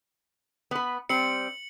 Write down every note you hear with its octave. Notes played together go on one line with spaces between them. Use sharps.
B3 B4
G3 C4 C#7 F#7